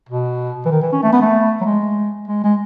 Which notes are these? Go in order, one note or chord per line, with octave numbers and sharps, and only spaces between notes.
B2
E3
D#3
E3
C#4
A3
B3
A3
F#3
G#3
G#3
G#3